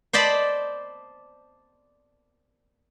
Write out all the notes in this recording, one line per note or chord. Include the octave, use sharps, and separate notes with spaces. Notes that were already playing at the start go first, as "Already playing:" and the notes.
C5 D5 D#5 A5 B5